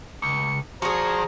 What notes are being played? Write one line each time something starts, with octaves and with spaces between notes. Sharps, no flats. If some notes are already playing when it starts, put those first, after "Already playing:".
C#2 C#7
F3 F#4 G#4 C5 D5 A#5 C#6